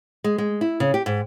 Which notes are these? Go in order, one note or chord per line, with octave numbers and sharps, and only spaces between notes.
G#3
G#3
E4
C#3
G4
G#2